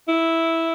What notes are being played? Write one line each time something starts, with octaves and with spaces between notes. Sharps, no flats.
E4